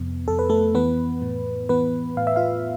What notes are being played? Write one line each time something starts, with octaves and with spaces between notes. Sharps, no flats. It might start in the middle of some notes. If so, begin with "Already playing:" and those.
Already playing: F2 C3 B3
F2 A4
B4
A3 A4
E3 B3 B4
A2
E3 B3 B4
A2 F5
E5
F4 F5